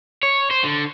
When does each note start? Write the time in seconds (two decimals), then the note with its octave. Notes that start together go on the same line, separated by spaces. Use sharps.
0.23 C#5
0.51 C5
0.64 D3